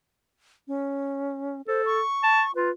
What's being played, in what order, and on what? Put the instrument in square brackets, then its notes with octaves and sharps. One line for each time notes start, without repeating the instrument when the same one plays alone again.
[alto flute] C#4
[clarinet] A4 [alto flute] C5
[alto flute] C#6
[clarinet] A5
[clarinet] F4 [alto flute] B4